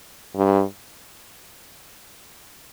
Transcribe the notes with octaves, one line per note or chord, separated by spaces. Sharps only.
G2